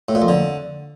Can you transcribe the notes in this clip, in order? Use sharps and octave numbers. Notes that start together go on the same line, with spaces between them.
A2
A#2
F2
D3